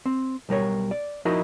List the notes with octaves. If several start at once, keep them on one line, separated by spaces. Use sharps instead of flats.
C4
B1 G3 A#4 C#5
D5
F3 D#4 E4 F#4 A#4 D#5